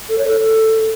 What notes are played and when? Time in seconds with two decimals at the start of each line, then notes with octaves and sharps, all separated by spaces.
0.09 A4
0.18 C#5
0.28 A4